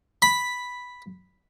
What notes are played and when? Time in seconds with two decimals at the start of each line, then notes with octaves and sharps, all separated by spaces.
0.22 B5